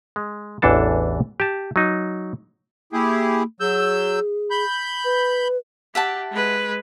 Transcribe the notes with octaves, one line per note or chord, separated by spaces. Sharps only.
G#3
A1 E2 E3 D4 A4 A5
G4 A5
F#3 D#4
A#3 E4 G4 G#4
F#3 G#4 E6 G6
B5 G6
B4
G4 E5 F#5 A5
G#3 B4